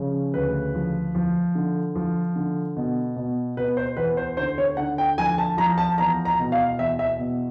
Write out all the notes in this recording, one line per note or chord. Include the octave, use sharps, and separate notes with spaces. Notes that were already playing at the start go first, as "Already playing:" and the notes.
Already playing: C#3 F3
D2 B4
F3
F3
D3
F3
D3
B2
B2
B2 B4
C5
E2 B4
C5
D3 C5
C#5
D3 F#5
G5
F3 G#5
A5
F3 A#5
A5
E2 A#5
A#5
B2
F5
E2 E5
E5
B2